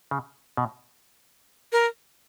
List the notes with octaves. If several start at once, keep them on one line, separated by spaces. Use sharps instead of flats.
C#3
B2
A#4